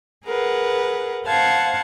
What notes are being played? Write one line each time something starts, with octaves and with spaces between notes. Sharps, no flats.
G#4 A#4 B4 F#5
C5 F5 F#5 A5 G#6